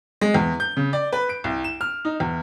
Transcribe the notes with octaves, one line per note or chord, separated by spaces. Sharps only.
G#3
E2
G6
C#3
D5
B4
D7
C2
E7
F6
D#4
E2